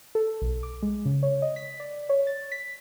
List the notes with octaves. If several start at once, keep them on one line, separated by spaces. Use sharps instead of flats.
A4
B1
D6
G#3
C#3
C#5
D#5
B6
D5
C#5
A6
B6